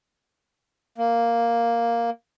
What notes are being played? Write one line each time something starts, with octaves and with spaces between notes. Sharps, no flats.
A#3